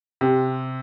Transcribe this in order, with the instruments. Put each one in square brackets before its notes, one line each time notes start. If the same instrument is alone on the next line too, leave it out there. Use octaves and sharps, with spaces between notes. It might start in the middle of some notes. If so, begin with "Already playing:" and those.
[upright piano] C3